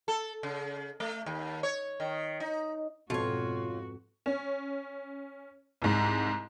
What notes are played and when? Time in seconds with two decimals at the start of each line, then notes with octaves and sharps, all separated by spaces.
0.08 A4
0.43 C#3
1.00 A3
1.26 D#2
1.63 C#5
2.00 D#3
2.40 D#4
3.10 F2 G#2 B2 F4 F#4 C#5
4.26 C#4
5.82 C2 G#2